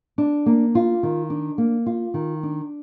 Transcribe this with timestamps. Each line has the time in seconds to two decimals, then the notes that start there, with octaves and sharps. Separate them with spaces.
0.18 D4
0.46 A#3
0.75 F4
1.03 D#3
1.30 D4
1.58 A#3
1.86 F4
2.14 D#3
2.43 D4